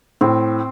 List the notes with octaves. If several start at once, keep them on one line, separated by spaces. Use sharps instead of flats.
A2 C4